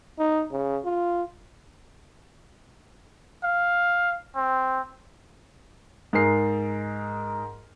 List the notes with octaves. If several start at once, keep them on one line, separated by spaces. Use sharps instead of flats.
D#4
C#3
F4
F5
C4
G#2 G#4 A#4 C7